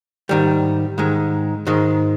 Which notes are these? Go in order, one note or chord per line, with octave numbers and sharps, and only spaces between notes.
G#2 D#3 G3
G#2 D#3 G#3
G#2 D#3 G#3